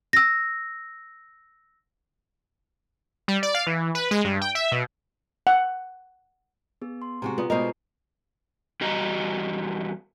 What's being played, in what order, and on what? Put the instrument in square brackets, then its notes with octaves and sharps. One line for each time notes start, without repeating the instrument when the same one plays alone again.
[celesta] E6 A#6
[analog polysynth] G3
D5
F5
E3
B4
G#3
G2
G5
E5
B2
[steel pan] F#5
[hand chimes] B3 G#4
C6
[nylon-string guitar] C3 G#3 F#4 [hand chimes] A#5
[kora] B3 [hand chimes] F4 D5 D#6
[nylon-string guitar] B2 G#3 A#4 [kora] D#4 C5 [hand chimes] D#5
[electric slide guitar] E2 G3 F#4 D#5 A#5